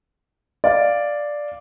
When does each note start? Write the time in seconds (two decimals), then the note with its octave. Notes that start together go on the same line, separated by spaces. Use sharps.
0.64 D5 F5